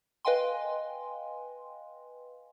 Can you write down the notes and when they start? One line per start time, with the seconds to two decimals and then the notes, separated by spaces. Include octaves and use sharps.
0.25 B4 D#5 F5 G5 G#5 C6